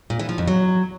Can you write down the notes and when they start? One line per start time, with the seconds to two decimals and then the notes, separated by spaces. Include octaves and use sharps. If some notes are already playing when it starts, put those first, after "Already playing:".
0.10 A#2
0.19 E3
0.29 F3
0.38 F2
0.48 F#3